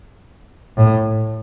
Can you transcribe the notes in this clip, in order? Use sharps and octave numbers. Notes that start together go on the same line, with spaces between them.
A2